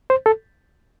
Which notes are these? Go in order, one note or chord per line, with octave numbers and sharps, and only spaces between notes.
C5
A4